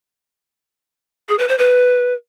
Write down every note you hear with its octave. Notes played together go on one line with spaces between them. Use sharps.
G#4
B4
C5
B4